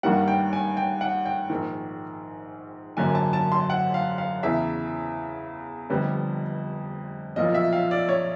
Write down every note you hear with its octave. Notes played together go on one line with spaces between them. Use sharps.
G2 D#3 G3 A#3 F#5
G5
G#5
G5
F#5
G5
A#1 G#2 D#3
G#1 F#2 D3 F#3 A#3 G#5
A5
A5
C6
F#5
F5
F5
E2 C#3 E3 E5
F1 F2 D3 G3 B3
B1 A#2 F3 D#5
E5
F5
D5
C#5